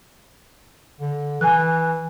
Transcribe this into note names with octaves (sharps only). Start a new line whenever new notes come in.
D3
E3 G#5 F#6